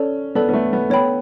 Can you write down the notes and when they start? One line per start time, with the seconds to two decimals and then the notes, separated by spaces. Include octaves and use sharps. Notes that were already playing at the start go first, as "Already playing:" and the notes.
Already playing: C#4 A4 D5 A5
0.35 B3 A4 D5 A5
0.49 B3
0.53 A3
0.73 B3
0.90 B3 A4 C#5 G5 B5